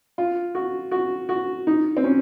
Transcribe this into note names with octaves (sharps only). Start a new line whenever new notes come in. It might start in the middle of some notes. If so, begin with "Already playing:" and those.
F4
F#4
F#4
F#4
D#4
C4
C#4